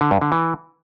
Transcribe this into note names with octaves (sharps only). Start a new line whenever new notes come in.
D3
G2
D3
E3